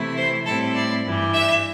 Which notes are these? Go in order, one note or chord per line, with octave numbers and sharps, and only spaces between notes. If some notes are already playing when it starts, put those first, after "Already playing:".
Already playing: C3 E3 A3 E4
C5
A2 G3 C4 E4 A4
D5
G2 E3 G3
E5